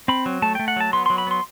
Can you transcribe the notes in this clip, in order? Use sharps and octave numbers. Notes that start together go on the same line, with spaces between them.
C4 B5
F#3
A3 A5
A3 G5
F#5
F#3 A5
B3 C6
F#3 C6
B5
B3 C6